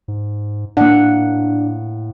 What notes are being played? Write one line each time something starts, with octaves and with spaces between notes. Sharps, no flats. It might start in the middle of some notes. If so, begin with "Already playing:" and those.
G#2
A2 A#3 D4 F#5